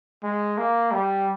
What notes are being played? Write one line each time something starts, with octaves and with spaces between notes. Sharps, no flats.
G#3
A#3
G3